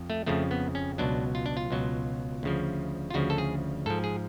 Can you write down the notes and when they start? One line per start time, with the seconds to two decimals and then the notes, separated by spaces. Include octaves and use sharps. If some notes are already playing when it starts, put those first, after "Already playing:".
Already playing: F2
0.10 A3
0.26 F2 C#3 F3 A3
0.51 B3
0.75 C#4
0.98 C#2 B2 F#3 D4
1.35 F4
1.46 D4
1.57 F4
1.70 C#2 B2 F#3
2.43 D2 C#3 F3
3.10 F4
3.14 D2 C#3 F3 F#4
3.30 A4
3.38 G#4
3.86 G#2 F3 A4
4.04 G#4